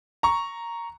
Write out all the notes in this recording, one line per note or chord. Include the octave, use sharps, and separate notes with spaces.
A#5 C#6